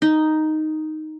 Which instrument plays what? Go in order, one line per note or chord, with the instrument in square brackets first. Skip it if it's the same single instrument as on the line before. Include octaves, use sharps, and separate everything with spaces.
[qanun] D#4